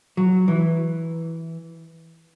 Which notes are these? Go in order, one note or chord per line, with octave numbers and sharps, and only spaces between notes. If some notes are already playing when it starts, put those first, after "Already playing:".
F#3
E3